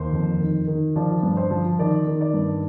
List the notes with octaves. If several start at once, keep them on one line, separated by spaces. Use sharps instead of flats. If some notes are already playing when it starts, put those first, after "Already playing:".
Already playing: D#2 C5
F2
D#3
D#3
F3 D5
G2
C5
F3
D#3 D5
D#3
D5
G2